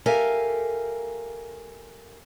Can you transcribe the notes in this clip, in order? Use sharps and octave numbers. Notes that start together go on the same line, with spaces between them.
G4 A4 A#4 E5 F5 G#5